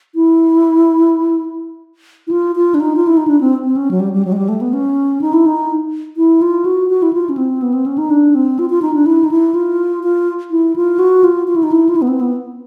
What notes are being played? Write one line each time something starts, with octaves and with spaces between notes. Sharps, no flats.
E4
E4
F4
F4
D4
D#4
F4
E4
D#4
D4
C4
C4
C#4
F#3
G3
G3
F#3
G#3
G3
A3
B3
C#4
D#4
E4
D#4
E4
F4
F#4
F#4
E4
F4
C#4
C4
B3
C4
C#4
D#4
D4
C4
F4
F4
D#4
D4
E4
D#4
E4
F4
F4
E4
F4
F#4
F4
F4
E4
D#4
E4
F4
E4
B3
C4
B3